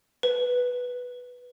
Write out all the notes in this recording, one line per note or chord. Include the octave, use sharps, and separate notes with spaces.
B4